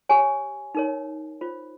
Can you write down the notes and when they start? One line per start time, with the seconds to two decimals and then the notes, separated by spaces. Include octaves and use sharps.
0.09 G4 C#5 G#5
0.75 D#4 A#4 C#5
1.41 F4 C5